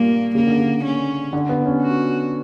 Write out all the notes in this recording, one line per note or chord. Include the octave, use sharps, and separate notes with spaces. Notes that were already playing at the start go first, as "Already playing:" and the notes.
Already playing: G2 A#2 A#3
C#3 A#3
D3
C#3
C#4
D3
B3
C#4
F#4